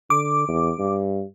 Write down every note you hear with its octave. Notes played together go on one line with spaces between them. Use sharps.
D3 D6
E2
G2